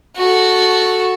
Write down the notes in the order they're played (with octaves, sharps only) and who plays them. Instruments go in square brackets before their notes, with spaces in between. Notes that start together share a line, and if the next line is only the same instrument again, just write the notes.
[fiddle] F#4 A4